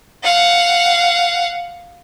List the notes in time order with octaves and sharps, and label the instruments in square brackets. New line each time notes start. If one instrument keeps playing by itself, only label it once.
[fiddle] F5 F#5